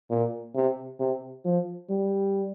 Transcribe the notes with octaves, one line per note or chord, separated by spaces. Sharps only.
A#2
C3
C3
F3
G3